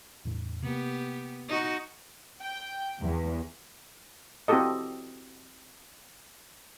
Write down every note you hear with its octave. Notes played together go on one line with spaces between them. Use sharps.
E2 A2
C3 A#3 B3 G4
D#4 F#4
G5
E2
C4 E4 F#4 G4 A4 D#5